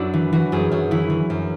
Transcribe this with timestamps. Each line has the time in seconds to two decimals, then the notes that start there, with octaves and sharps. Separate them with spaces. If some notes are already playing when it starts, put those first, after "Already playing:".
Already playing: F#2 D4 E4 F#4
0.14 E3
0.33 E3 F#4
0.52 F#2 G#4
0.71 F#2 F#4
0.91 E3 E4
1.10 E3
1.30 F#2